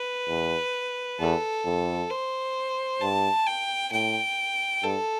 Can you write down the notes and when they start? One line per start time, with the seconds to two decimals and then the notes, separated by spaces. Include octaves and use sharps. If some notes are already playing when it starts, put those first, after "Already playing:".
Already playing: B4
0.29 E2
1.20 E2 A4
1.65 F2
2.10 C5
3.01 G2 A5
3.47 G5
3.92 A2 G5
4.83 G2 A4